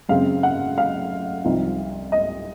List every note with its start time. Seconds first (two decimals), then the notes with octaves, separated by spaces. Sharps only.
0.09 F#2 C#3 G#3 C4 F5
0.43 F#5
0.78 F5
1.44 C2 C3 F3 C4 D#4
2.12 D#5